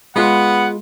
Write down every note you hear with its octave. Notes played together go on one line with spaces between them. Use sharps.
G#3 B3 F4 F#5